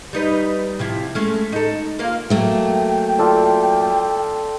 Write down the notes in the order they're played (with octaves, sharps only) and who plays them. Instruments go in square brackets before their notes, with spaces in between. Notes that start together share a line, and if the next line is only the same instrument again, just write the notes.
[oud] G3 D#4 B4
C3 F3 E4
G#3 A3 C#4
D#4 A4
A#3 F4 F5
[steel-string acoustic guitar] F#3 A3 A#3 [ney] G5
[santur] F4 A4 D5